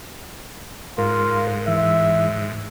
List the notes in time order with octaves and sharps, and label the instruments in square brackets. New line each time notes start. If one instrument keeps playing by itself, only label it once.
[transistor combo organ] G#2 [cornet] F4 [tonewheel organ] A#4
[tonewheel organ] E3 [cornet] E5